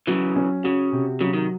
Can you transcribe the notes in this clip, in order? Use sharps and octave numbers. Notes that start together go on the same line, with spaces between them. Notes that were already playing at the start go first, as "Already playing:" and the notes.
C#3 E3 F#3
C#4
C#3 F#4
C3
C#3 F#3
D#3